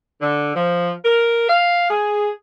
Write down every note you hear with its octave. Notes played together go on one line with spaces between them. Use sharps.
D3
F3
A#4
F5
G#4